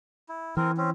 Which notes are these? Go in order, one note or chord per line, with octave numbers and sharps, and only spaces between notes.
E4
E3 C4 A#4
C4 C#4